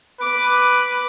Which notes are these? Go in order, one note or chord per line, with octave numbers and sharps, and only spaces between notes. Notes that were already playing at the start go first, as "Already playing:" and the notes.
B4 D6
D6